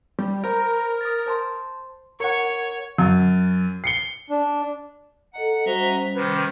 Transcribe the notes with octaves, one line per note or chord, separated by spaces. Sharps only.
G3
A#4 C5 A#5 B5
D#6 A6
C5 A5 C6
A#4 C#5 F#5 C#6
F#2
C7 C#7 G7
D4
A4 D#5 F#5 A#5
G3 C#4 F#4 C5 D#5 E5 A#5
C3 D#3 B4